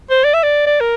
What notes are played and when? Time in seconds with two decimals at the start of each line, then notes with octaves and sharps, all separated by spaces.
0.10 C5
0.24 D5
0.34 E5
0.43 D5
0.66 D5
0.80 A#4